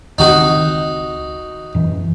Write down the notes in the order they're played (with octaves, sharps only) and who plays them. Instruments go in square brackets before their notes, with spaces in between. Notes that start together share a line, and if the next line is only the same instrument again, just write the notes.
[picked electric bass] C#2 D#3 C4 [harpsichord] D#4 F#4
[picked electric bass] F#2 E3